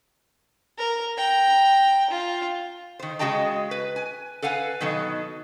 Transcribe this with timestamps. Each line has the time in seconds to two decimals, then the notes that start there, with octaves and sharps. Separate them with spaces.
0.78 A#4
1.18 G5 A#5
2.10 F4
2.99 D#3 C5
3.19 C#3 G#3 F#4 D#5 G5 A5
3.71 B4
3.96 G#5
4.42 A4 B4 F5 F#5 G#5
4.81 B2 D#3 F#3 D#4 A4